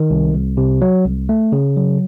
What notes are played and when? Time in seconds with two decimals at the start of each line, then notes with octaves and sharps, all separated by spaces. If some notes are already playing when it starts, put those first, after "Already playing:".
Already playing: D#3
0.10 C2
0.34 C2
0.57 C3
0.81 F#3
1.05 C2
1.29 A3
1.52 C#3
1.77 F#3